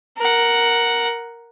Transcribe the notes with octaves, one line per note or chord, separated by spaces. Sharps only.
A#4 F#5